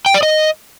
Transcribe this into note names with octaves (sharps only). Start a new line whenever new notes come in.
G5
D5
D#5